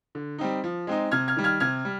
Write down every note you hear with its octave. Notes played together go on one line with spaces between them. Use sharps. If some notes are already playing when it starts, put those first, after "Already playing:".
D3
G3 C4 D#4
F3
G#3 C4 D#4
C3 F6 G#6
F6 G#6
D#3 G3
F6 G#6
C3 F6 G#6
G3